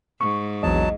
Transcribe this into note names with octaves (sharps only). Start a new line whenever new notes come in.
G#2 C#6
A#1 E2 F#3 D#5 A5